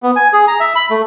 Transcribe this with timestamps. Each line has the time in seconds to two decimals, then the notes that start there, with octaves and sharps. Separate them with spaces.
0.03 B3
0.16 G#5
0.33 G#4
0.47 A#5
0.60 E5
0.75 B5
0.90 A3